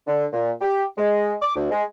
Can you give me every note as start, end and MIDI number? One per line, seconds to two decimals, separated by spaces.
0.07 0.26 50
0.33 0.52 46
0.61 0.84 67
0.98 1.34 56
1.42 1.55 86
1.56 1.69 38
1.71 1.83 56